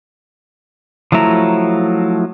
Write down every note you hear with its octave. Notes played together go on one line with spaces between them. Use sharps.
F3 F#3 A3 E4 A#5